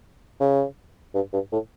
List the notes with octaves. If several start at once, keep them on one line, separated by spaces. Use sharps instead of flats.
C#3
G2
G2
A2